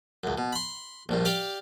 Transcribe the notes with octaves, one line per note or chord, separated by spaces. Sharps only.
C#2 F#2
B2
B5 C6
A#1 G2 A#2
G4 D5 F5 G5